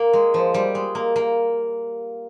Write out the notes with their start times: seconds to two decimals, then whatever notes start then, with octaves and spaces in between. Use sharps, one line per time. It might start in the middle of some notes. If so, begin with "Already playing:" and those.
Already playing: A#3
0.13 G#3
0.34 F3
0.54 G3
0.75 G#3
0.95 A#3
1.16 A#3